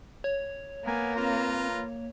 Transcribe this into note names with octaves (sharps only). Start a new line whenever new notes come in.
C#5
A#3 B3 A#4 G#5
C4 F4 B4 A#5
A#3